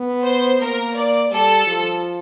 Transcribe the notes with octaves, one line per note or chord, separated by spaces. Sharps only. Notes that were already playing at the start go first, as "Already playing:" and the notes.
Already playing: B3
C5
A#3 A#4
D5
G3 A4
F3